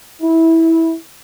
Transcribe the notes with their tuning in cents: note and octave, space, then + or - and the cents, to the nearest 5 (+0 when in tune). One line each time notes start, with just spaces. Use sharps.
E4 -15